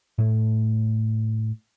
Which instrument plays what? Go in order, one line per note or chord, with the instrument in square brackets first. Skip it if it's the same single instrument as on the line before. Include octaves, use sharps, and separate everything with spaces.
[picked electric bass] A2 A3